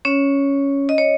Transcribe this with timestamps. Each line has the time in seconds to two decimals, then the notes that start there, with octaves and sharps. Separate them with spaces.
0.05 C#4 C#5
0.89 D#5
0.98 C#5